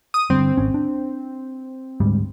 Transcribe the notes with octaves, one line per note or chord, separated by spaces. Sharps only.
D#6
G2 D3 G3 C4
G#1 C#4
D4
D2 G#2 G3